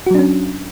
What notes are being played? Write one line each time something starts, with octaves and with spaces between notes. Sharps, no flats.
F#3 C#4 D4 F#4